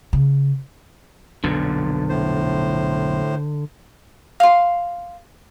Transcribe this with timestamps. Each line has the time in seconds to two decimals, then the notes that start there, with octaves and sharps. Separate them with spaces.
0.13 C#3
1.44 B1 F2 A#2 D3
2.09 A2 C5
4.40 F5 C6